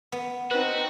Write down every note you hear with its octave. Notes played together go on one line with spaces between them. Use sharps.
B3
C4 D#4 F#4 B4